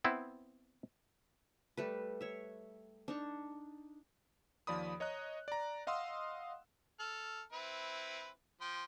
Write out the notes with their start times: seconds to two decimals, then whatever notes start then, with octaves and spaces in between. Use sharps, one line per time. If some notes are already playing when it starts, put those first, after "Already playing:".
0.04 B3 C4 E4
1.77 G3 A3 B4
2.21 C#5 E5
3.08 D4 D#4 C#6
4.67 D#2 F3 D5 B5 D#6
5.00 C#5 D#5 A#5 F#6
5.48 D5 A#5
5.87 D#5 F5 F#5 C6 D#6 E6
7.00 A4 F6
7.52 C4 E4 B4
8.61 F3 G5 C6